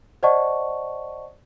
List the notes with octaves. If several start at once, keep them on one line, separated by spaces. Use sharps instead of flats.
C5 D5 D#5 F#5 A5 C#6